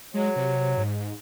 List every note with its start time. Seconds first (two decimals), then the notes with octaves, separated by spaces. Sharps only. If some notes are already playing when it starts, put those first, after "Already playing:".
0.14 F#3 G#3
0.36 C3
0.77 G#2